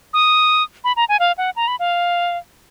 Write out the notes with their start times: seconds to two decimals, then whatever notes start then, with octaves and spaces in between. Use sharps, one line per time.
0.14 D#6
0.84 B5
0.96 A#5
1.09 G#5
1.20 F5
1.38 F#5
1.56 A#5
1.68 B5
1.79 F5